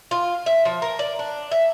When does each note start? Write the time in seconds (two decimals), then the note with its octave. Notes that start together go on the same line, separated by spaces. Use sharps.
0.11 F4
0.46 E5
0.65 F3
0.82 A#4
0.99 D5
1.19 D4
1.51 E5